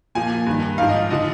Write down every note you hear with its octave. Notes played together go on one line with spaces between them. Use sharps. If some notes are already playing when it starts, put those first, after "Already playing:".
A#2 F3 G#5
G2 D#3
G#2 F3 F5
D#5
D3 F3 D#5